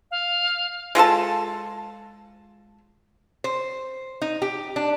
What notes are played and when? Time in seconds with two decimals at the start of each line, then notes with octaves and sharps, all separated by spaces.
0.11 F5
0.95 G#3 F4 A4 A5
3.44 C5
4.21 D#4
4.42 G4
4.76 D4